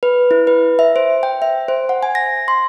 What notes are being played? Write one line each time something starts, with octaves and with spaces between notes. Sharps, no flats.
B4
E4
B4
E5
C5
G5
E5
C5
F#5
G#5
A#6
C6